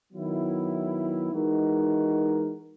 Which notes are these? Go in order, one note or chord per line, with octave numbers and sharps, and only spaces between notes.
D#3 F#3 B3 E4
E3 G#3 D#4 F#4 A#4